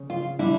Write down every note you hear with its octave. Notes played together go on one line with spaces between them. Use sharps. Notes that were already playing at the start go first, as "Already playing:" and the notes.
Already playing: C#3 C#4
F4
D3 G3 D4 E4